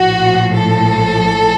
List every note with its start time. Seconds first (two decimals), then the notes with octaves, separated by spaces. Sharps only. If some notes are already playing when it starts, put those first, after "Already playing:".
Already playing: A#1 A2 F3 F#4
0.58 A4